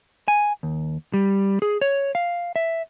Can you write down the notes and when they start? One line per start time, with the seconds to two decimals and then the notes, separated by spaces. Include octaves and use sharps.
0.28 G#5
0.63 D#2
1.14 G3
1.62 G#4
1.81 C#5
2.15 F5
2.56 E5